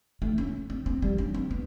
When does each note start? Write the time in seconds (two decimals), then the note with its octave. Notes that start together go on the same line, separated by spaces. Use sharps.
0.22 A3
0.38 C#4
0.70 C4
0.86 C4
1.02 G3
1.18 C#4
1.34 C4
1.51 B3